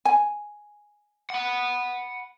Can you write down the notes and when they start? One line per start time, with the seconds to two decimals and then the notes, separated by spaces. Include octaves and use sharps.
0.05 G#5
1.30 F#5 B5